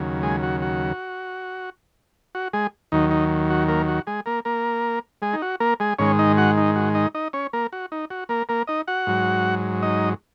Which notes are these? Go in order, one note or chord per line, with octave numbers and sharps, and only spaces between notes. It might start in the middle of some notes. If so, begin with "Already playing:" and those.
Already playing: D#2 C#3 F#3
G#3 G#4
F#4
F#4
F#4
G#3 G#4
D#2 D#3 F#3 D#4
D#4
F#4
A#3 A#4
F#4
G#3 G#4
A#3 A#4
A#3 A#4
G#3 G#4
D#4
F#4
A#3 A#4
G#3 G#4
G#2 D#3 G#3 C#4 C#5
D#4 D#5
F#4 F#5
D#4
F#4
D#4 D#5
D#4 D#5
C#4 C#5
A#3 A#4
F#4
D#4
F#4
A#3 A#4
A#3 A#4
D#4 D#5
F#4 F#5
G#2 F#3
D#4 D#5